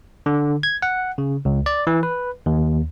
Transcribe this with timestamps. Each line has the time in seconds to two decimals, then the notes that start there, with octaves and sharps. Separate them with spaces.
0.26 D3
0.63 G#6
0.82 F#5
1.18 C#3
1.45 C#2
1.66 D5
1.87 E3
2.03 B4
2.46 D#2